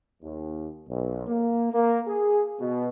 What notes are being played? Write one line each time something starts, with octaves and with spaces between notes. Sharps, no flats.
D#2
B1
A#3
A#3
G#4
B2